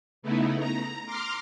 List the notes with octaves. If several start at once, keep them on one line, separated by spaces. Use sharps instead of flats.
C#3 A3 B3 D#4 E4
A#5
A#5 C6 D6 F6